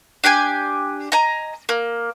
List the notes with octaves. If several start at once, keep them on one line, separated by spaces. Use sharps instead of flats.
D4 G4 G5 G#5
D#5 G#5 A#5
A#3